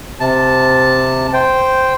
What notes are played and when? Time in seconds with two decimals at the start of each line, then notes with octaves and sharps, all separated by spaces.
0.20 C3 A5
1.33 C5 G5